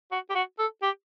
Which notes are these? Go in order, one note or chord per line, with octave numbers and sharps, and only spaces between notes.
F#4
G4
F#4
A4
G4